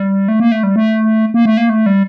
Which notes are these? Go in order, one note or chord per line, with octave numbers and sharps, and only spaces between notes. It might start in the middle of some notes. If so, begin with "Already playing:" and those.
Already playing: G3
A3
A#3
A3
G3
A3
A#3
A3
A#3
A3
G3